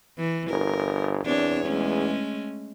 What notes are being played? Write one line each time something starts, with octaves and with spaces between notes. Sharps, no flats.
E3
G1 A#4
E2 C4 D4 C#5
G#3 A3 C#4